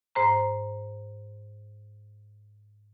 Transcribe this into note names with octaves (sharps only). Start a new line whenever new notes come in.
G#2 C5 A#5